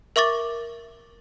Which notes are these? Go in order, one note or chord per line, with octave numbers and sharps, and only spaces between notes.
A#4 E5 C#6 D6 A6